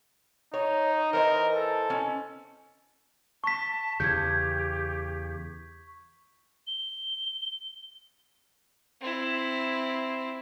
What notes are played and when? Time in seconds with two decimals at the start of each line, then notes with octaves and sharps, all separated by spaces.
0.54 D#4 C#5
1.13 E3 A#4 C5 D#5
1.55 A4
1.90 C#4
3.44 A5 C#6 B6
4.00 E2 C#3 G4 G6 G#6
6.67 G7
9.01 C4 E4